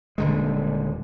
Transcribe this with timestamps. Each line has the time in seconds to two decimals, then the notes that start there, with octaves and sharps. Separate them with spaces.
0.18 D#1 D3 G#3